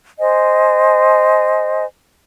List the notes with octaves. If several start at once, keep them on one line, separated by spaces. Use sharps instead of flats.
C5 D#5 G#5